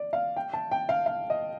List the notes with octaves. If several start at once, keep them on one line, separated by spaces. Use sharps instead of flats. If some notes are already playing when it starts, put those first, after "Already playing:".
Already playing: D5
F5
G5
A5
G5
F5
F5
D#5